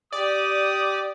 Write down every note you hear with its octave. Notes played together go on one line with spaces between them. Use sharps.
G4 D5 D#6